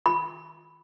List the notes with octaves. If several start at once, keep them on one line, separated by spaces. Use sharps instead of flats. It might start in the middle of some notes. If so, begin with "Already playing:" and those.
B5